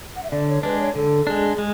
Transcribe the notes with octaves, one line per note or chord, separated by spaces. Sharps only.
F#5
E5
D3 D5
C#5
G#3 D4 B4
C#5
D3 A4
G#3 D4 G#4
G#3